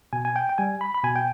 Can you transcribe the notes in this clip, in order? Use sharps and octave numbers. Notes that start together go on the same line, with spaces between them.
B2 G#5
G#5
G5
G5
G3 G#5
B5
B5
B2 G#5
G5